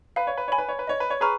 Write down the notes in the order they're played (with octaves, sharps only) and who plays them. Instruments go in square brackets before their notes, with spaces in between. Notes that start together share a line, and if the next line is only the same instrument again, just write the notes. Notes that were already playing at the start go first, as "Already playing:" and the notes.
[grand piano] B4 [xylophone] F5
[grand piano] C#5
B4
[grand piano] C#5 [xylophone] G#5 B5
[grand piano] B4
C#5
B4
[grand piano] C#5 [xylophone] D#5
[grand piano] B4
C#5
[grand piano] G#4 B4 [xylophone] A#5 C#6 F6